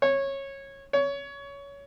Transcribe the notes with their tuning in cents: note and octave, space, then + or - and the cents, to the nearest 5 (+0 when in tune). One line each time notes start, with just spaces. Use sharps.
C#5 -15
C#5 +20